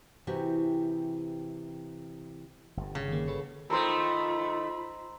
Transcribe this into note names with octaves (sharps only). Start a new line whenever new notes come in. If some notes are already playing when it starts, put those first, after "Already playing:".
C3 E3 F#4 G4
G1 G2
C#3
D#3 A#3
A4 B4 C#5
D#3 A3 F4 C5 A#5 B5 E6